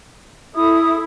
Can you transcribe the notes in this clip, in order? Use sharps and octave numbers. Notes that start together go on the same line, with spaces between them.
E4 A4 D#6